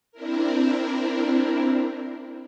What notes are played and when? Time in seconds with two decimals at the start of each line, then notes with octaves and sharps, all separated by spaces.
0.12 C4 D4 E4 A#4